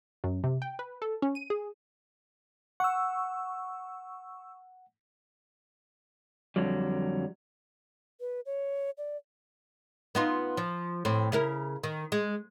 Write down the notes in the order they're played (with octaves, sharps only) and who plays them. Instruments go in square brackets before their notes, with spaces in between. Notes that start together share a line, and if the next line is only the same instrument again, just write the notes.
[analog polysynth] F#2
C3
G5
B4
A4
C#4
D#7
G#4
[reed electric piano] F#5 [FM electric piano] C#6 E6
[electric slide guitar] F2 D3 F#3 G3
[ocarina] B4
C#5
D5
[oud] B3 D#4 F4
F3
A2 C4
C#3 E4 A#4
D#3
G#3